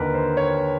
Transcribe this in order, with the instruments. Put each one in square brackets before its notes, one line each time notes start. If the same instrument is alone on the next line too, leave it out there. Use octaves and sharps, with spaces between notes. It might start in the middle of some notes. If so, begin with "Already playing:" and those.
Already playing: [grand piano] D#2 D3 A#4 B4
C5
C#5